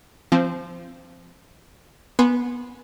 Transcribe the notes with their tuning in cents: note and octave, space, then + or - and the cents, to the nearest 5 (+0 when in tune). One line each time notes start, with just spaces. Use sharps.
F3 -20 C4 +0
B3 -15 G#5 +0 C6 +0